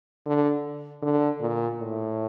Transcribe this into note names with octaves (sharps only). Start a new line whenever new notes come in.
D3
D3
A#2
A2